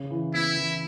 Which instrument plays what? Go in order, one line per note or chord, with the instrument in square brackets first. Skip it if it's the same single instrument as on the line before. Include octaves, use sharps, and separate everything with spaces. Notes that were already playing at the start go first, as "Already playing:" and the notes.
Already playing: [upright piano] C#3
E3
[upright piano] B3 [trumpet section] E4
[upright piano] E3